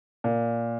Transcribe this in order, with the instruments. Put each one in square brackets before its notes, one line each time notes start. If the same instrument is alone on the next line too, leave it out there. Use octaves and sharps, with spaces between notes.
[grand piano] A#2